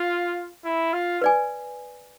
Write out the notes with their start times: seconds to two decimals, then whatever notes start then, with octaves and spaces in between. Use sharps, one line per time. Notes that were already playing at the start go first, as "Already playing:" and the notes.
Already playing: F4
0.65 E4
0.93 F4
1.22 B4 D5 G#5